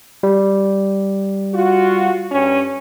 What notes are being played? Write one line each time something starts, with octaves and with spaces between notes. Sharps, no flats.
G3
F4 F#4
G2 C#4